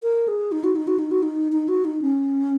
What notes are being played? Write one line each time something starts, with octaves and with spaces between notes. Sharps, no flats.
A#4
G#4
D#4
F#4
D#4
F#4
D#4
F#4
D#4
D#4
F#4
D#4
C#4